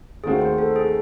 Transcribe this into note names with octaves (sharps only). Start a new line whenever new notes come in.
D#2 D#3 A3 C4 F#4 G#4
C5
A4
G#4